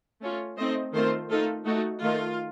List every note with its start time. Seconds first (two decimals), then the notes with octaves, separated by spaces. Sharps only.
0.22 A3 C#4 F4
0.57 A3 C4 D#4 C5 D#5
0.93 D#3 A3 C4 F4 A4 C5
1.30 A3 D#4 F4 A4
1.66 A3 D#4 F#4
2.01 D#3 A3 D#4 F4